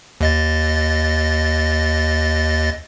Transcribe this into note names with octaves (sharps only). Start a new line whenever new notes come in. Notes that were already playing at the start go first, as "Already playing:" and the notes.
D#2 D#5 A6